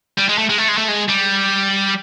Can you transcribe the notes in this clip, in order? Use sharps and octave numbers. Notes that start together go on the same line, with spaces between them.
G3
G#3
A3
G#3
A3
G#3
A3
G#3
G3